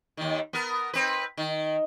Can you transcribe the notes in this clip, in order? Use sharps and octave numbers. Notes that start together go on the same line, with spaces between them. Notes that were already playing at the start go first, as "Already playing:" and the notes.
D#2 D#3
B3 A#4
C4 B4
D#3